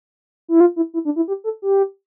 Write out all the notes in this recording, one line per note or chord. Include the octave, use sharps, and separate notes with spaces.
E4
F4
E4
E4
D4
E4
G4
A4
G4